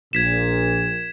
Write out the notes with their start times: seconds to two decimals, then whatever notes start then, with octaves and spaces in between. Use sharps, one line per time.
0.13 A#1 A#2 G#6 B6 E7